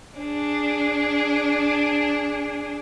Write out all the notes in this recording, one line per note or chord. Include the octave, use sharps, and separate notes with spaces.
D4 G#4